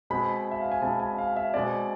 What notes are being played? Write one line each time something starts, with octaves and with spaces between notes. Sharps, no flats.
B2 G#3 C4 B5
E5
F5
G#5
B2 G#3 C4 A5
G#5
F5
E5
B2 G#3 C4 D5